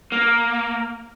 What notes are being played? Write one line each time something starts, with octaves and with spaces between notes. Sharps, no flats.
A#3